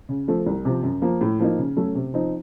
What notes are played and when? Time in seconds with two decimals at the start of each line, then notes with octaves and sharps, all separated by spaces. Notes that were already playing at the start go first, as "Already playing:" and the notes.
0.09 C#3
0.28 F3 A3
0.46 C2
0.65 C3 F3
0.83 F#2
1.02 F3 A#3
1.21 A2
1.39 F3 A#3 D#4
1.59 C#3
1.77 F#3 A3 C#4 A4
1.95 C3
2.14 F3 C4 D#4